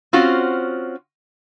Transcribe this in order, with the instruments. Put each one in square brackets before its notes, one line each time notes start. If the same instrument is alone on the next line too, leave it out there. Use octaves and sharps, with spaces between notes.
[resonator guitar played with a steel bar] C4 C#4 F4 F#4 C5